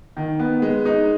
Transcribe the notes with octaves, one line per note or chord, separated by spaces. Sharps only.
D#3
B3
G#3
D#4